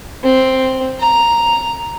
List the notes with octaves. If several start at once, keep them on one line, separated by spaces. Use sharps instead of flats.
C4
A#5